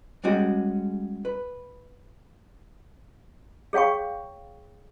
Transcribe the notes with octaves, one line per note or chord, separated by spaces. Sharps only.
G3 G#3 C#4 F#4 G5
B4
G#4 C#5 F5 G5 C#6